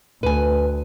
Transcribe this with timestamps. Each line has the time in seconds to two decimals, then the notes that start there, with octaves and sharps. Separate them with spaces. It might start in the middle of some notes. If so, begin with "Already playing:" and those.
0.23 D2 B4 G#5